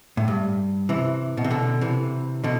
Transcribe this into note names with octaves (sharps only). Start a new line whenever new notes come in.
A2
G2
C3 E3
B2
C3
B2 D3
C3 E3
B2 D3